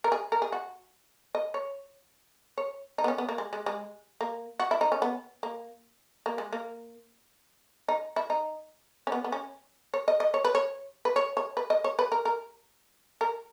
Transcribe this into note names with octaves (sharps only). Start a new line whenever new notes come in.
A#4
G#4
A#4
G#4
F#4
D#5
C#5
C#5
D#4
B3
C#4
B3
A#3
G#3
G#3
G#3
A#3
F#4
E4
D#4
C#4
B3
A#3
A#3
G#3
A#3
D#4
E4
D#4
C#4
B3
B3
C#4
C#5
D#5
D#5
C#5
B4
C#5
B4
C#5
C#5
B4
D#5
C#5
B4
A#4
A#4
A#4